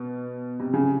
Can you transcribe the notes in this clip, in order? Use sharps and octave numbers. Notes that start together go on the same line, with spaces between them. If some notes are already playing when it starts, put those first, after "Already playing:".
Already playing: B2
C3
C#3